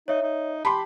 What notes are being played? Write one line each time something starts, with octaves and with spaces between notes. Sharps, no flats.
D#4 C#5 E5
D#4
G4 A5 B5 C6